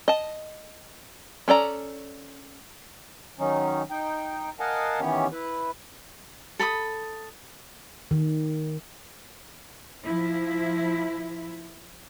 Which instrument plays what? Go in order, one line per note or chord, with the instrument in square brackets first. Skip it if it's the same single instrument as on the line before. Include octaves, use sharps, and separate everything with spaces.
[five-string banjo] D#5 A5
C#4 A4 D5 A#5
[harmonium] D#3 F#3 C#4 D#4
D#4 G5
A#4 D#5 F5 F#5 G#5 A5
D#3 E3 B3 C#4 G4 C#5
E4 B4
[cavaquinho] A4 B5 C6 D#6
[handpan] D#3
[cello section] F3 E4